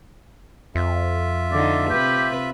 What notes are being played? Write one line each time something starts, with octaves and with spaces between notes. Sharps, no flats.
F2 F4 E5
D3 D#4 D5
C3 G4 B4